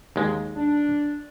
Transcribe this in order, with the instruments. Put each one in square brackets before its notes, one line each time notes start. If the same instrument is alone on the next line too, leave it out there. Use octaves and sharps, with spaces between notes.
[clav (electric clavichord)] D#2 G#3
[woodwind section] D4